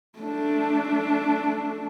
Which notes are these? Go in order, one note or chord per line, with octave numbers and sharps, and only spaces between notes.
A3 D4